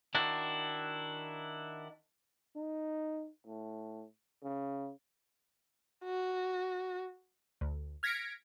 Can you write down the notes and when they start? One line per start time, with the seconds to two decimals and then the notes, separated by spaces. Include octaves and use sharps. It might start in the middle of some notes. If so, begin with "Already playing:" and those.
0.15 D#3 D4 E4 F#4
2.56 D#4
3.46 A2
4.43 C#3
6.04 F#4
7.61 D2
8.03 F6 G#6 A#6 B6 C#7 D7